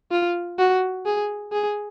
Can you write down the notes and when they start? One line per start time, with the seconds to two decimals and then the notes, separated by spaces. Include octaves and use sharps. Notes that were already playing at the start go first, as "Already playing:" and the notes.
0.12 F4
0.59 F#4
1.06 G#4
1.53 G#4